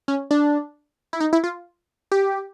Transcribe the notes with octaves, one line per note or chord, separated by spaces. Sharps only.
C#4
D4
E4
D#4
E4
F4
G4